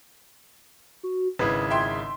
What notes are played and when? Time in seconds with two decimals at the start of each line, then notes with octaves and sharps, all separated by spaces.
1.03 F#4
1.39 G#1 C#3 E4 B4 G#6
1.70 E5 G5 C6